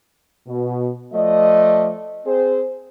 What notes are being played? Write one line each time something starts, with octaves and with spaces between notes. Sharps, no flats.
B2
F3 A3 D5 D#5
C4 G#4 C5